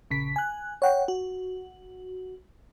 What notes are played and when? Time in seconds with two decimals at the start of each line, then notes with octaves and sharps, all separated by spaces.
0.11 A#1 C#3 B6
0.36 G#5 F#6
0.82 C#5 F#5 G5
1.08 F#4